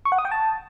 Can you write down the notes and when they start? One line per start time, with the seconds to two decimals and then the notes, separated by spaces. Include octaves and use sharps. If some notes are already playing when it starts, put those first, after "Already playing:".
0.05 C#6
0.12 F#5
0.18 D#6
0.25 G5
0.32 A5